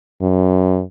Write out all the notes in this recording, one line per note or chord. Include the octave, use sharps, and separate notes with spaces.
F#2